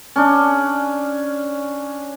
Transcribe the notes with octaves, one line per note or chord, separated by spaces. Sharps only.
C#4 D4